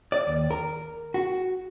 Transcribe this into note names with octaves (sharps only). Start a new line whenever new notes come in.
D5
D#2
A#4
F#4